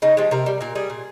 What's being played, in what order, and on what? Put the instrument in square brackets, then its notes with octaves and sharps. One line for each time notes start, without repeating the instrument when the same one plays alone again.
[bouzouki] C#3 D#4
F3 G#3 G4
C3 A#4
G3
A#2 A#4
G3 G#4
A#2